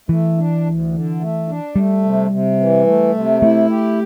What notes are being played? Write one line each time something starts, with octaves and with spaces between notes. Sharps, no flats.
E3 A3
D4
D2
D3
A3
D4
G3 A3
C3
C3
E3
A3
C3
A3 E4
G4